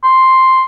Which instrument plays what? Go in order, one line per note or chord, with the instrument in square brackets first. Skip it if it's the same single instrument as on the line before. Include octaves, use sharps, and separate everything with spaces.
[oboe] C6